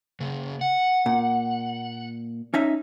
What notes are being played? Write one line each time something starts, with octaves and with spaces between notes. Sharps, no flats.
C#3 A#3
F#5
A#2
C#4 D#4 E5